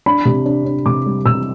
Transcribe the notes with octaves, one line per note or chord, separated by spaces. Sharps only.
D4 B5
C3
D4
D4
C3 D6
G3
C3 E6